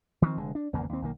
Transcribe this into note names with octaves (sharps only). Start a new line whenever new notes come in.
D#3 F3 A3 C4
F1 D3 G#3
D4
G#1 E2 C#3 A#3
D#2 C4
B1 D#3 A#3